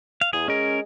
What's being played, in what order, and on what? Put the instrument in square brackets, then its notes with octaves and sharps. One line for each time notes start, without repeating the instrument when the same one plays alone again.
[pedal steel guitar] F5
[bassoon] E2 [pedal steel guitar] G#4
[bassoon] G#3 [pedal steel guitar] C#4 A#4